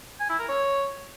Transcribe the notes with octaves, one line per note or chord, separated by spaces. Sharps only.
G#5
E4
A#4
C#5